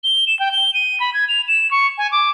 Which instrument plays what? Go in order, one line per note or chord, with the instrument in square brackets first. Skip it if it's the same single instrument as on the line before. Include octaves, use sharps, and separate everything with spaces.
[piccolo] G7
E7
G5
G7
D#7
B5
G#6
F7
E7
C#6
G#5
D6